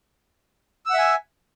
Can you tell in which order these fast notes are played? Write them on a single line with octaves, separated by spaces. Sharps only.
E6 F#5 E5 G#5